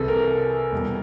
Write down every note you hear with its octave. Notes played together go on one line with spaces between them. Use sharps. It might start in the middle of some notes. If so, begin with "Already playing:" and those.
Already playing: C2 C3 E3 G#4 A4
A#4
E2 B2 G3